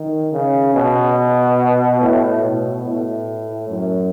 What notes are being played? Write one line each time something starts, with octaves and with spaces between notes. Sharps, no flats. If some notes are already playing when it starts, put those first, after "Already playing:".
Already playing: D#3
C#3
B2
A2
B2
A2
F#2